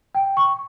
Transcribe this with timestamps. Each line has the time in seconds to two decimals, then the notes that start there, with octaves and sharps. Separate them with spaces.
0.15 G5
0.37 C#6